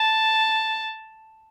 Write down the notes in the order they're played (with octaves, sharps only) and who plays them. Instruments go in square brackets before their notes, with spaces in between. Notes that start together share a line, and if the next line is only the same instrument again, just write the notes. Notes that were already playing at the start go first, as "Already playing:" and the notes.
Already playing: [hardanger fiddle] A5